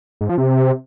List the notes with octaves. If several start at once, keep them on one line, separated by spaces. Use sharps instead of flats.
G#2
F3
C3